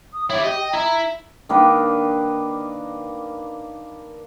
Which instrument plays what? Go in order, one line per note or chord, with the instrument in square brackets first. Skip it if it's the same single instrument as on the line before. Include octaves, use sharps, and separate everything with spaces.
[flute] D#6
[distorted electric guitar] E4 D5 [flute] C#5
[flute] G4 [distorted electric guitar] D#5
[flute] G5
[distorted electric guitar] E4 E5 [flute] A#5
[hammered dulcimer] D#3 A#3 D4 B4